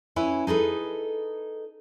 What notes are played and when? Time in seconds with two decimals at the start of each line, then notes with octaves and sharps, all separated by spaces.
0.16 C#4 E4 B4
0.47 D#4 G#4 A4 B4